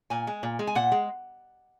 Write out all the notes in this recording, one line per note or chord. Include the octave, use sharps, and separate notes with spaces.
A#2 G#5
G#3
A#2
G#3
G#5
A#2 F#5
G#3